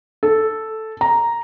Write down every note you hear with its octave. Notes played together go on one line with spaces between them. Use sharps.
A4
A#5